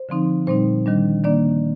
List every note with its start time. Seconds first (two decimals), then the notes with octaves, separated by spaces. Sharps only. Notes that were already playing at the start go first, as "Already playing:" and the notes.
Already playing: C5
0.09 D3 F3 C4 D#4
0.47 A#2 G3 C4 D#4 C5
0.86 D#3 G3 D4
1.24 D#3 A#3 D4 D5